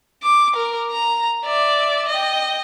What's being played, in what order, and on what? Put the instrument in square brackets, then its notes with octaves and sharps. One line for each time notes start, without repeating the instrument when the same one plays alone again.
[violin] D6
A#4
A#5
D5 E5
D#5 G5